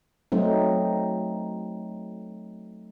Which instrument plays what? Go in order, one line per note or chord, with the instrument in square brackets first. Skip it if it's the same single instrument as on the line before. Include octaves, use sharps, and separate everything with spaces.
[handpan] F#3 A3 C4 D#4